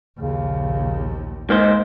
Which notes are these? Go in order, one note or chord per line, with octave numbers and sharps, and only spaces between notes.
A#1 D#2 C#3
G#3 A#3 D#4 C5